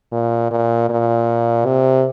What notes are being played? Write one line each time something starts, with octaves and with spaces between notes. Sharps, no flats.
A#2
A#2
A#2
C3